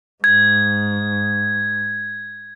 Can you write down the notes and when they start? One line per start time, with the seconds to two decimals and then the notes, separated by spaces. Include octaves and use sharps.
0.24 G#2 G#6